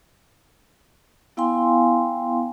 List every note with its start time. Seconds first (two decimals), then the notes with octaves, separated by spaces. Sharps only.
1.37 B3 E4 F5 G5 G#5 C6